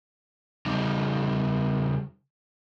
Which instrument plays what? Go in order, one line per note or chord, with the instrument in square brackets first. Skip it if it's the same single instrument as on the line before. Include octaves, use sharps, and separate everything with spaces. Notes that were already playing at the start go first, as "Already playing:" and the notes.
[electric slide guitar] C#3 G3 D#4